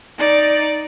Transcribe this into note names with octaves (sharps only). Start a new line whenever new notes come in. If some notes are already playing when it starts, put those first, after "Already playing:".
D#4 D5